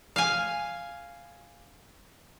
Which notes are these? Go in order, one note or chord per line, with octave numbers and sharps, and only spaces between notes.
F5 G#5